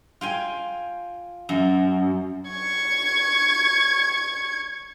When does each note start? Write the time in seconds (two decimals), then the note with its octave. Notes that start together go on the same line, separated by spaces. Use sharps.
0.21 F4 G5 G#5
1.49 F#2
2.50 C#6 G#6